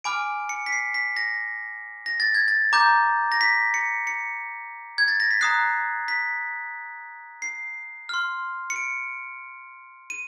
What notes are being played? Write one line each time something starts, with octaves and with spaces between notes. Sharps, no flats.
G#5 B5 D6 F6 D7
C#7
B6
C7
B6
A#6
A#6
A6
G#6
A6
A#5 D6 G6
A#6
B6
C#7
C#7
G#6
A6
A#6
B6
A#5 D#6 F#6 C7
B6
C7
C6 F6
C#7
D7
D#7